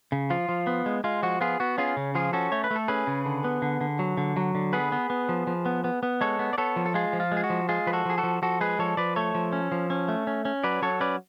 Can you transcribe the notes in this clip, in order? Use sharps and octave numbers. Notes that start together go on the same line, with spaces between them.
C#3
F3 F4
F3
B3
G#3
G#3 F4
F3 F#4
B3 F4 G#4
B3 F#4
C#4 F4 G#4
C#3
F3 F4 G#4
C#4 F#4 A4
A3 C#5
B4
A3
A4
C#4 G#4 B4
C#3
D3
B3
D3
D3
F#3
D3
F#3
D3
B3 G#4 B4
B3
B3
F3
F3
B3
B3
B3
G#3 A4 C#5
B3
D5
B3 A4 C#5
F3
A4
G#3 F4 G#4
F3
F4
G#3
G#4
F#4
F3
G#3 F4 G#4
F3 B4
F#4 A4
F3 G#4
F#4 A4
F3
F3 F#4 A4
G#3 G#4 B4
F3 A4 C#5
F3 B4 D5
A3 A4 C#5
F3
C#4
F3
C#4
A3
C#4
C#4
F#3 B4 D5
F#3 A4 C#5
C#4 B4 D5